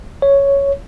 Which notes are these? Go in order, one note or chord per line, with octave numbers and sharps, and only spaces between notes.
C#5